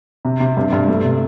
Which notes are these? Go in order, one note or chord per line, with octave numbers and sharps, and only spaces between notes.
C3
C3
G2
G2
A3
C3